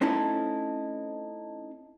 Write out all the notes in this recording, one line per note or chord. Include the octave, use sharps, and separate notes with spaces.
A3 C4 C#4 D#4 E4 A4